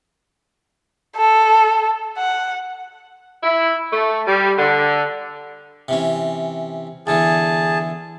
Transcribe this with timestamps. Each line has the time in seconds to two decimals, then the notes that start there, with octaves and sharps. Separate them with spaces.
1.17 A4
2.18 F#5
3.43 E4
3.93 A3
4.27 G3
4.58 D3
5.88 C3 E3 C#4
7.07 E2 D3 E3 G#4 A5